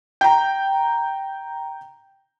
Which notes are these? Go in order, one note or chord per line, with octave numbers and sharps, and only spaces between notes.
G5 A#5